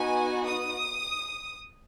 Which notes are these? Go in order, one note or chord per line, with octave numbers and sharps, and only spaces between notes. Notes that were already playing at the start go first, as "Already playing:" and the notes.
Already playing: B3 D#4 F#4 G#5
D#6